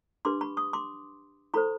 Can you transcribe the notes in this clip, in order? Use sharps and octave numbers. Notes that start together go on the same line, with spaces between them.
D4 G4 B4 C6 D6
B5 C#6
C#6 D#6
C6 D6
E4 A4 C5 B5 C#6